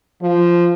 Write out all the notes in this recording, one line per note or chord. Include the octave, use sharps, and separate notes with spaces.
F3